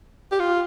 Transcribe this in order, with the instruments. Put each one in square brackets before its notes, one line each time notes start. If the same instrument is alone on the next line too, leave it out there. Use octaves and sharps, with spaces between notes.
[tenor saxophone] G4
F4